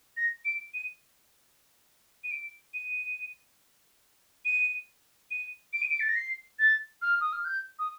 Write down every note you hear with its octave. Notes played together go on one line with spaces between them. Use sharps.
A#6
D7
D#7
D#7
D7
D#7
D#7
D#7
D7
D#7
D7
A6
A#6
C7
A6
F6
D#6
F6
G6
D#6